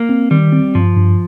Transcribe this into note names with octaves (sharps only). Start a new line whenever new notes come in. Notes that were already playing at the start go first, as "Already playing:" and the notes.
Already playing: A#3
C4
D#3 G3
C4
G2 F3
G2